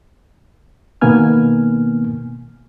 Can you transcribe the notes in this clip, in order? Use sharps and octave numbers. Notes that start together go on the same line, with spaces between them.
B2 D#3 A#3 B3 G#5 F6